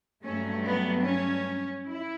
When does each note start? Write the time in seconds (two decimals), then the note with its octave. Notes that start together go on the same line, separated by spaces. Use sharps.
0.24 G2 F#3 A3 C#4
0.65 B3
1.06 C#4
1.87 E4